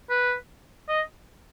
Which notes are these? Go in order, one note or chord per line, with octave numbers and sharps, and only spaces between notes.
B4
D#5